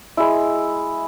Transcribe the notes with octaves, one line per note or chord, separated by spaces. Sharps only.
G#3 E4